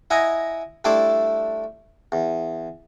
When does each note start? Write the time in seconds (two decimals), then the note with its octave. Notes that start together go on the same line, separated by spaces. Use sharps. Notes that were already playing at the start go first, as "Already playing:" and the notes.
0.10 E4 D#5 F#5 G#5 A#5
0.85 G3 A3 D4 E4 C5 D5
2.12 E2